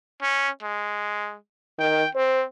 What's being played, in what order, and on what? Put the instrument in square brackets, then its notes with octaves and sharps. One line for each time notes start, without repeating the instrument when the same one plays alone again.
[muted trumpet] C#4
G#3
[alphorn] D#3 [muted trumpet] G5
[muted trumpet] C4 [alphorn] C5